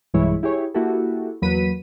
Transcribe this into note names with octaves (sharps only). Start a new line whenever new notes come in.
B1 G2 E3 G#3 E4 C#5
E4 G4 G#4 C#5
A#3 E4 F#4 G4 A4
E2 F#3 A#3 B4 B6 D#7